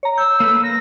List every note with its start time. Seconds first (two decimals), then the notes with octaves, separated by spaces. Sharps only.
0.03 C#5 A#5
0.18 E6 G6
0.40 A#3 A4 B4
0.64 A#6